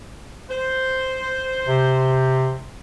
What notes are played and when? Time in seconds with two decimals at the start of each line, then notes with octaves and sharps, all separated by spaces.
0.50 C5
1.67 C3